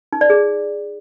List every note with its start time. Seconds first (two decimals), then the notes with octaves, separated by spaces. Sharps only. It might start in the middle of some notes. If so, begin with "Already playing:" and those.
0.13 D#4
0.21 D5
0.30 G#4